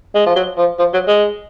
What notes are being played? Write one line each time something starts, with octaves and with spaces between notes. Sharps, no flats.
G#3
F3
F#3
F3
F3
F#3
G#3